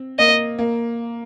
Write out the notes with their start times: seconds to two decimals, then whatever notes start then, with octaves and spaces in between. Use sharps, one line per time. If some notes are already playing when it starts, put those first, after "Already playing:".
Already playing: C4
0.19 A#3 D#5
0.59 A#3